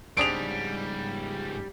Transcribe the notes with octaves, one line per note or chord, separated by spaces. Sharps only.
G#2 C#3 G3 C4 D4 G#4 D7 F7